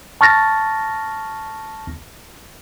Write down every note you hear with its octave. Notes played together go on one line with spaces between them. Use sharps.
A5 C#6 F6 A6 A#6